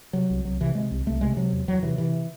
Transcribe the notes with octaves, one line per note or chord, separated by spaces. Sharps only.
C3 F#3
C2
C2 F#3
C3 E3
C3 G#3
C2
C2 A3
C3 G#3
C3 F#3
E2
E2 F#3
C3 E3
C3 E3